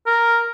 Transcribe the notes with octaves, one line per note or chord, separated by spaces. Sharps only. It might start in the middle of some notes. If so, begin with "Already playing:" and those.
A#4